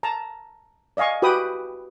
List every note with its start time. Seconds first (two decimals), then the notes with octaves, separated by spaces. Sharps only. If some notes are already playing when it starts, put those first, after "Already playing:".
0.03 A5 A#5
0.97 D5 D#5 F5 G#5 C#6
1.22 F#4 G4 B4 G5 B5 D#6